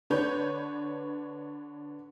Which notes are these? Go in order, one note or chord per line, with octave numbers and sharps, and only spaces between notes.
D3 D4 B4 C#5 G6